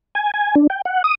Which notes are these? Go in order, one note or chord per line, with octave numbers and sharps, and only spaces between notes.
G#5
G#5
D4
G5
F#5
D#6